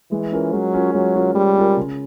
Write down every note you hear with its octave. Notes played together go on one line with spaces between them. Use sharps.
E3 G#3
C#4 F4 A#4
F#3 G#3
C#4 F4 A#4
F#3 G#3
C#4 F4 A#4
G3 G#3
C#4 F4 A#4
C#3